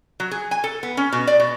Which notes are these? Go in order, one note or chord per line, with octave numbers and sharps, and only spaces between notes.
F#3
G#4
G#5
A4
B3
C#4
B2
D5
B2